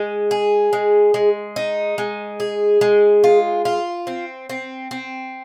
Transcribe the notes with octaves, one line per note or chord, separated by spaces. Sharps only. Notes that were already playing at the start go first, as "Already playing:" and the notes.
Already playing: G#3
G#4
G#3
G#3
D#4
G#3
G#4
G#3
F4
F4
C4
C4
C4